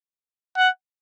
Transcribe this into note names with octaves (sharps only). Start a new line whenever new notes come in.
F#5